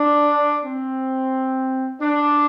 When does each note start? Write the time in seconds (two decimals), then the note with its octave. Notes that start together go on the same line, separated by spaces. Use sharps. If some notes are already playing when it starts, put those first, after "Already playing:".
Already playing: D4
0.65 C4
2.01 D4